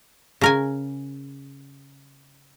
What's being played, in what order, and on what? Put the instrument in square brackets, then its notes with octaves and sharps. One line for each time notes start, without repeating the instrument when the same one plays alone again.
[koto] C#3 A#4 G#5